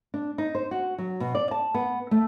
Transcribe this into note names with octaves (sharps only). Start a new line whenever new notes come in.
D4
D#4
C5
F#4
F#3
B2
D5
A5
B3
A3